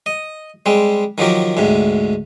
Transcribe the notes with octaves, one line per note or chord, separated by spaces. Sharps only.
D#5
G3 G#3 C4
D#3 F3 F#3 G4 A#4
D2 G#2 C3